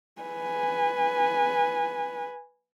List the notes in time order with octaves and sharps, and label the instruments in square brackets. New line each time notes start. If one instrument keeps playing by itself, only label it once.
[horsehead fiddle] B4 G#5